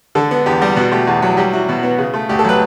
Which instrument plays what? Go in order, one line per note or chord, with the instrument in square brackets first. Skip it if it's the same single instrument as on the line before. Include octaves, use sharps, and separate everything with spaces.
[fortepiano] D3 A4
B3
E2 G4
G3 G4
B2 F#4
A3 G4
E2 F#4
F#3
G3 G4
E4 F#4
B2
B3
C#3
A3
D2 G4
A4
F#3 B4